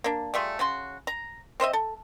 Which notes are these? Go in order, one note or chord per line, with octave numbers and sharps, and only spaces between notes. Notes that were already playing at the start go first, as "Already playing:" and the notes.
A#3 D4
G3 A3 F4 G#4
C#3 F#4 C6
A#5
C4 C5 D#5 E5
A4